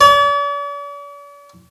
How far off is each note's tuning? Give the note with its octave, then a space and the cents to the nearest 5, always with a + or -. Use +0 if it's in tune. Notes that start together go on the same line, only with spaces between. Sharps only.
D5 -45